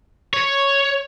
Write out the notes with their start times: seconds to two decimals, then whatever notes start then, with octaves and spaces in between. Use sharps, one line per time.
0.34 C#5